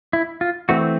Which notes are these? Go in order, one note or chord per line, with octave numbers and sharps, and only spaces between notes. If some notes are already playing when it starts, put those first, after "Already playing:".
E4
F4
E3 A3 C4 F#4